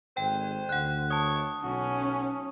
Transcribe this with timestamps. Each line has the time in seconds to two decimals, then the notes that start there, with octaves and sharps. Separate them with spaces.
0.17 G#1 C5 G5
0.69 D2 F#5 F#6
1.10 C#5 A5 D#6
1.64 B1 C#4 F#4